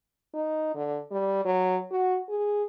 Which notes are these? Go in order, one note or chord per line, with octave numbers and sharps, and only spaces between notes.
D#4
D3
G3
F#3
F#4
G#4